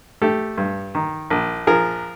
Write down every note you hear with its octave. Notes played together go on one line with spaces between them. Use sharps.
A3 G4 A4
G2
D#3
A#1
F3 G#4 A#4